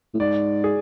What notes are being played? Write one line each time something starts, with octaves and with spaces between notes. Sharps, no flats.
A2
G#2 D5
G#4